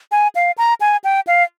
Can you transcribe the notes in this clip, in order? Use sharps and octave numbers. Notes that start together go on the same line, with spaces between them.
G#5
F5
A#5
G#5
G5
F5